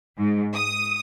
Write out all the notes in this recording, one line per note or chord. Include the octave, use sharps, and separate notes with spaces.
G#2
D#6